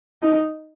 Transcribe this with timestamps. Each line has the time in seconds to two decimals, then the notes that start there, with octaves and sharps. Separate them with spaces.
0.22 D#4